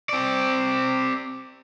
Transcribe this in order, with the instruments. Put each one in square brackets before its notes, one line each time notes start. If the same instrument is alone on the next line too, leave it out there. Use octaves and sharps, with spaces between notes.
[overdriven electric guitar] C4 D5